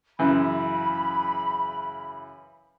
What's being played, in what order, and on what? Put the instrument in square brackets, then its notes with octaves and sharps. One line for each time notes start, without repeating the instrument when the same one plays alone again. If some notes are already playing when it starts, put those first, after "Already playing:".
[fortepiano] F#2 C#3 E3 [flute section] B5